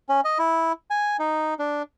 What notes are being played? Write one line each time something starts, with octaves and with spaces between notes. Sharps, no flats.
C#4
D#5
E4
G#5
D#4
D4